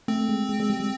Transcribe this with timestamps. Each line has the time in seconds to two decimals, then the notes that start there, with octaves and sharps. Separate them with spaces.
0.08 A3 C4
0.29 G#3
0.49 G#3
0.60 G#3
0.70 G3
0.80 G3